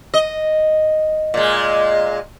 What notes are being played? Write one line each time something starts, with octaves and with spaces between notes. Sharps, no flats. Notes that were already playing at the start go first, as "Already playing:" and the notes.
D#5
A#2 G#3